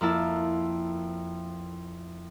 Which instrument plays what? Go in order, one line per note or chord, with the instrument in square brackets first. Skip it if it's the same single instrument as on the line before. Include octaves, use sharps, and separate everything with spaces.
[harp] F2 A#3 E4 A5